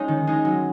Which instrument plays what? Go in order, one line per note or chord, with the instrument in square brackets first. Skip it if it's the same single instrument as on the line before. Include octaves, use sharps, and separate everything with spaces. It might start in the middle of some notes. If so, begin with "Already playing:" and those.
Already playing: [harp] G#3 C#4 D#4 F4
D#3
G#3 D#4
F#3